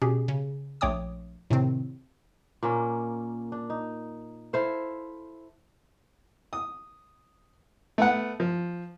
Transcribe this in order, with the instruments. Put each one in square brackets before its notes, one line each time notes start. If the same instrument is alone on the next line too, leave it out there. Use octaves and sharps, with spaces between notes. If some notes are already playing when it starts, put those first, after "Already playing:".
[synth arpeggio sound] B2 C#4 G4 G#4
C#3
A#1 A3 C#5 G5 D6 D#6
A2 C3 D#3 C4
[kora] A#2 A#3 C#4
D4
D#4
E4 A4 C5 F5
[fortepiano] D#6
A3 B3 F#5
F3